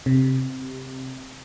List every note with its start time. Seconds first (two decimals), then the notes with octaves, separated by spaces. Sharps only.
0.06 C3